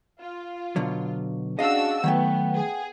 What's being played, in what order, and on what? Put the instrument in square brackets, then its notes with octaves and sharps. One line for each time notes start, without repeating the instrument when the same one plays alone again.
[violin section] F4
[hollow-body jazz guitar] B2 D3 F#3
[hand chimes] C#4 G#4 [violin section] D4 F#4 E6 [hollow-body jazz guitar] D#5 F5
[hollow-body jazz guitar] D#3 F#3 A3 [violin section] B3 [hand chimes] F#5 G5
[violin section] G#4